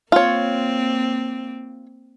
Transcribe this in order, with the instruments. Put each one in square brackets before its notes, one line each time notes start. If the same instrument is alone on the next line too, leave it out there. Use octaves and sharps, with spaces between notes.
[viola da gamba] A#3 C4 [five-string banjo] F4 C#5